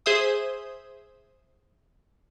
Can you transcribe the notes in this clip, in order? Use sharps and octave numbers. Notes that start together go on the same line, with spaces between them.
G#4 C5 E5 D#6